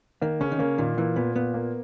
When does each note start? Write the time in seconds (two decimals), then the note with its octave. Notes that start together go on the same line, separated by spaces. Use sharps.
0.22 D#3 A#3
0.41 C#3 C#4
0.52 D#3
0.59 C#3 A#3
0.78 A#2 D#3
0.97 E3 A#3
1.16 A#2 B3
1.35 A#2 B3
1.54 A#3